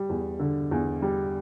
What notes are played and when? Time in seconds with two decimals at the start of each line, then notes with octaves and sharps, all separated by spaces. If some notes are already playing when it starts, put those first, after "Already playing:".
Already playing: G3
0.10 E2
0.39 D3
0.71 E2
1.02 G3